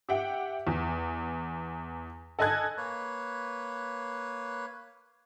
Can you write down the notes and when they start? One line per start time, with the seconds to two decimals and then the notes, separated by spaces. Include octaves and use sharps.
0.09 G4 E5 F#5 G5
0.67 E2
2.39 A4 D#5 G#5 A5 F#6 G#6
2.77 A#3 B4 C#5